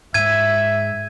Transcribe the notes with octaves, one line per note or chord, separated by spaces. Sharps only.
G#2 G#3 E5 G#6 D#7